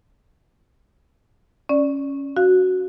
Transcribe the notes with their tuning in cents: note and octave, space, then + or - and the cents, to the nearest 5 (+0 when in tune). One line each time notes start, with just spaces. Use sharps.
C#4 +0 D5 +0
F#4 +0 F5 +0